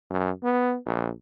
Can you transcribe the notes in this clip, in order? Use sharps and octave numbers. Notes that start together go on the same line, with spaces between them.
F#2
B3
A#1